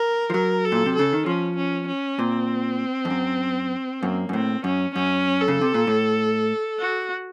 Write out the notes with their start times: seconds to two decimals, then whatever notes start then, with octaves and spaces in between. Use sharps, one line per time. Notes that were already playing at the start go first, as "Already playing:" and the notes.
Already playing: A#4
0.30 F3
0.33 F#3 A#4
0.65 A4
0.72 A#2
0.86 C3
0.96 C#3 A4
1.13 D#3
1.26 F3 C#4
1.56 C#4
1.87 C#4
2.19 A#2 C4
3.05 F2
3.10 F#2
4.02 F#2 A#3
4.29 F#2
4.33 A2 C4
4.64 F#2 C#4
4.95 F#2 C#4
5.41 A4
5.48 C#3
5.61 C3
5.74 A#2
5.87 A2
6.80 F#4